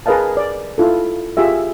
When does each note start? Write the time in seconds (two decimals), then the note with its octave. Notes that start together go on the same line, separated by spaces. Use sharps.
0.06 G#4 A#4 B4 D#5 F5 A5
0.37 D5
0.78 E4 F4 A4
1.37 F4 G4 G#4 E5